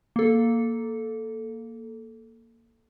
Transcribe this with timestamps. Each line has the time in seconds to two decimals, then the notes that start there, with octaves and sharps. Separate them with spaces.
0.16 A#3 A4